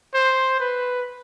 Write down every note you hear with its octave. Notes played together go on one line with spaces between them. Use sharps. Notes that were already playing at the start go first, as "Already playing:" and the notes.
C5
B4